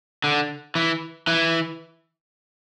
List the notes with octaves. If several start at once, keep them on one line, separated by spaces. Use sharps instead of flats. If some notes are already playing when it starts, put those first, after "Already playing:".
D3
E3
E3